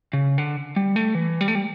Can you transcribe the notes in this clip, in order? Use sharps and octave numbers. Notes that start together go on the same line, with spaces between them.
C#3
D3
G3
A3
E3
G3
A3
G3